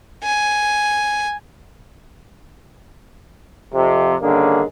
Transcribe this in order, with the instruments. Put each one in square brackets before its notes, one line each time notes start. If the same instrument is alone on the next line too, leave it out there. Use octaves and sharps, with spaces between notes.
[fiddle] G#5
[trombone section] F2 C3
G2 D3 D#3 A#3 C#4 G#4